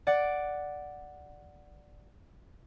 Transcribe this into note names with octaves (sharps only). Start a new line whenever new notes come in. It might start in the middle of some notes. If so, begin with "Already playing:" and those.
D5 F#5